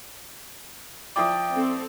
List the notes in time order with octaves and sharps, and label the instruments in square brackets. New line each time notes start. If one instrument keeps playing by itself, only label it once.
[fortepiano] F3 E4 D5 [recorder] G5 [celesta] D6 D#6
[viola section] C4 A4